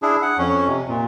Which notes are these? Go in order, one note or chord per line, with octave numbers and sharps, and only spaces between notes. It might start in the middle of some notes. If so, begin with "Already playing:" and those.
D4 E4 G#4
F#5
F2 C#4
C3
A#2